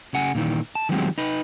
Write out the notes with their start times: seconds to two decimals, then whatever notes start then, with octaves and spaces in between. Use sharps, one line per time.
0.14 C#3 F#5 G#5
0.35 A#2 D#3 E3
0.75 A5
0.89 D#3 F3 F#3 G#3 C4 G4
1.18 D#4 B4